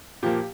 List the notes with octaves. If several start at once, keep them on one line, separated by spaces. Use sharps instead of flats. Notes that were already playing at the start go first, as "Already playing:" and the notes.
A#2 F3 A#3 G4